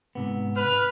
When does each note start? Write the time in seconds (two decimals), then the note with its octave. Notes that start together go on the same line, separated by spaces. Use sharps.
0.15 G#2 C3 B3
0.56 B4 F6